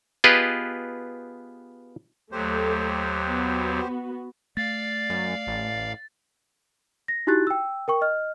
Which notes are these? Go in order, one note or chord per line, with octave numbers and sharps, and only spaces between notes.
B3 F4 G4 G#4 B4 D#5
D#2 F#3 A3 G4 C5
B3 F#4
A3 D5 F5 A6
F#2
A1
A#6
D#4 E4 F#4 G4 F#6 A6
G5 E6
A#4 G5 C#6
D#5 F6